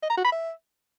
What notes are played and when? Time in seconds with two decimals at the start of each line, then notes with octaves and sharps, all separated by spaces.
0.02 D#5
0.10 A#5
0.17 F#4
0.24 B5
0.32 E5